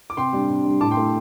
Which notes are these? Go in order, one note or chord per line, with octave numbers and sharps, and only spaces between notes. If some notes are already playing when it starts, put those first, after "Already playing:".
D6
C3 G5 C6
G3 D4
C3
G3 D4
A2 A5 D6
G5 C6
A3 E4